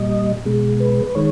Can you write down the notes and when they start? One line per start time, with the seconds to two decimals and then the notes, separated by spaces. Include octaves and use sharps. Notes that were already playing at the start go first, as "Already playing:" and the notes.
Already playing: A#2 G3 D#5
0.45 B2 G#3
0.80 B4
1.07 B4
1.15 D#3 G#3 C#5